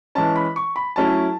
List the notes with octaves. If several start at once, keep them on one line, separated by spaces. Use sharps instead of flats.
E3 G#3 C#4 A5
B5
C#6
B5
F#3 A3 C#4 E4 A5